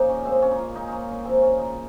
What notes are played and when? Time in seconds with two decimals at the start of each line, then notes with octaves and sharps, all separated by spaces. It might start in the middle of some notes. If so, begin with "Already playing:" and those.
Already playing: C#3 F3 A#3 D#4
0.09 C#4
0.25 A#2 G#3 C4
0.42 C#4
0.51 D#4
0.58 F4
0.75 A#2 G#3 D#4
0.88 C#4 D#4
1.09 C#4
1.25 C#3 F3 A#3 C4
1.42 C#4
1.59 D#4